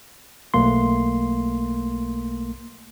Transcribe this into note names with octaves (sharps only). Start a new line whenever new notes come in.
B1 A3 A#3 C6